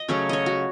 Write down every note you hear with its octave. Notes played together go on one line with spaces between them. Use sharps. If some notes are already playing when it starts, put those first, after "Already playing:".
Already playing: D#5
C#3 F#3 A3 C#4 C#5
C#5 D#5
F#4